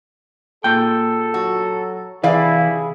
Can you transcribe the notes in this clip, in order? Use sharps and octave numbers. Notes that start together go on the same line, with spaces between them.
A#2 G#4 A4 G5
F#3 F#4
C3 E3 E4 G#4 D5 F5